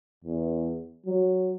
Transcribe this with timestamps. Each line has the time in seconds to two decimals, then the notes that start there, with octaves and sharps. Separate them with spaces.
0.24 E2
1.06 F#3